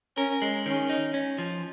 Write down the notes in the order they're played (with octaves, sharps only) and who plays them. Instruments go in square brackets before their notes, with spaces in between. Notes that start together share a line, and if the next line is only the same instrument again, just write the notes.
[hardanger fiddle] C#4 [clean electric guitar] A#4
[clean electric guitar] G#3
[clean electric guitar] D#3 [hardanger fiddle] C#4
[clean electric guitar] D#4
C#4
F3